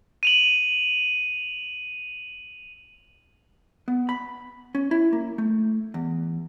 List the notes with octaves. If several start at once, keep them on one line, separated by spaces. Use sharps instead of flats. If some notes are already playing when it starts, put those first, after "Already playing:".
D#7 F7 F#7
B3
B5
C#4
E4
A#3
A3
E2